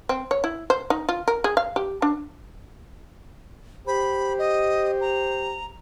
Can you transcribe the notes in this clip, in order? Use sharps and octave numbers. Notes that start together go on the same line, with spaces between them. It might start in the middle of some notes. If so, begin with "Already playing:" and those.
C4
C#5
E4
C5
D#4
F4
A#4
G#4
F5
G4
D4
G4 C5 B5
D#5
A#5